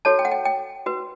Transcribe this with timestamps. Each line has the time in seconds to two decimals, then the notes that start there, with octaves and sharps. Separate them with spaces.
0.05 F#4 A4 C#5 A5
0.19 G5
0.25 F#5
0.32 G5
0.45 G5
0.86 F#4 B4